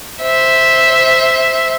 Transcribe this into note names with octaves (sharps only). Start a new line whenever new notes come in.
C5 E5